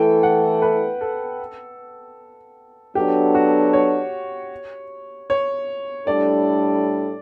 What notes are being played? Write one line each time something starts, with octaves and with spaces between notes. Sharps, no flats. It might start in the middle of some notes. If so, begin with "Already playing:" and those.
Already playing: E3 A3 E4 A4 G5
F#5
B4
A4
F#3 B3 D4 G4 A4
F#4
C#5
C#5
A2 G3 D4 A4 D5